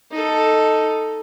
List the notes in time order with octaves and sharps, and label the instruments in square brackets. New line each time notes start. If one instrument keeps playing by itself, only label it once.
[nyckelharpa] D#4 A4